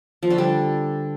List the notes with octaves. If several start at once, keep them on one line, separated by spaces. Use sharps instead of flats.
F3
D3
G3